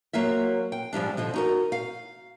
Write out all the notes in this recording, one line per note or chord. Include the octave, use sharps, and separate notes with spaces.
F#3 A#3 F4 E5
G5
G#2 F3 G3 D4
D3 F3 D#5
D#4 F#4 A#4
F5